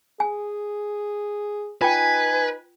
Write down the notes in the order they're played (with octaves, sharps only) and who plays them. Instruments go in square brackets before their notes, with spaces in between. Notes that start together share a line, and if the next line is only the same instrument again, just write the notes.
[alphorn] G#4 [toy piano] G#5
[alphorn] D#4 [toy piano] F4 G5 [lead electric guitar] B4 [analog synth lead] G#5